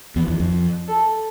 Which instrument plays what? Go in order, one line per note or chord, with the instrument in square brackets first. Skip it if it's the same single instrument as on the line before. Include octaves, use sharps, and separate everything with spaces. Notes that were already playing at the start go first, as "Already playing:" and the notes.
[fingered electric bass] E2
E2
F2
[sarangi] A4